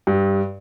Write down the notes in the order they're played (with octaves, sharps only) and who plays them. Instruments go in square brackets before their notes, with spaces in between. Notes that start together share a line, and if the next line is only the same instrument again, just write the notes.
[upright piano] G2